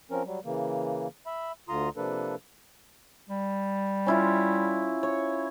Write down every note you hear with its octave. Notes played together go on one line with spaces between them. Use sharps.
F3 C4 C#4 A#4
F#3 G3
C#3 E3 A#3
E5 B5
D2 D3 F4 A#5 C6 D#6
C3 F3 A#3 D4 A4 B4
G3
C#4 E4 F4
C#5